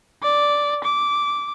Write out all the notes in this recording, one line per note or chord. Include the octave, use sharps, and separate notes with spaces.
D5
D6